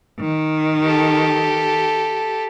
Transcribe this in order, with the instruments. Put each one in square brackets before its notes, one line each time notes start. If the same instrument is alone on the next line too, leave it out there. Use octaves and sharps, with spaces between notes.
[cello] D#3
[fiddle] G4 A4